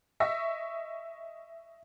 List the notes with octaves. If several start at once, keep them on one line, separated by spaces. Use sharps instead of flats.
D#5 E5 C#6 E6 A#6